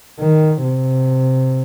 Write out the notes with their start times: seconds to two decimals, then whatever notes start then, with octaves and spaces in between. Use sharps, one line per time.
0.20 D#3
0.64 C3